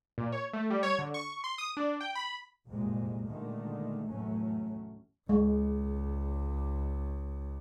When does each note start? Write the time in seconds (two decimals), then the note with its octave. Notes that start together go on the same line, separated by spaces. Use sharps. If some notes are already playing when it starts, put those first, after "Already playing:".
0.18 A#2
0.32 C#5
0.53 A3
0.70 G3
0.83 C#5
0.99 D3
1.14 C#6
1.44 C6
1.58 D#6
1.77 D4
2.00 G5
2.15 B5
2.67 F#1 C2 F2 A#2 G#3
3.27 A#2 D3 D#3 G#3 A3
4.06 F1 E2 A2 F#3 A3 C#4
5.29 C#2 G#3